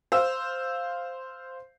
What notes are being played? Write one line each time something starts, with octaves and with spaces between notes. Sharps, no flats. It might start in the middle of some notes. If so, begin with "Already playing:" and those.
C5 F5 E6